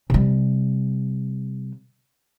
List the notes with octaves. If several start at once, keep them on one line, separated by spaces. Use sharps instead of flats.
C3 G3